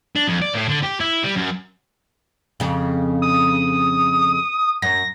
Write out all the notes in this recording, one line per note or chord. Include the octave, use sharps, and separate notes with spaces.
D4
F2
D5
A2
D3
G4
E4
G3
F#2
F2 C#3
D#6
F#2 A#6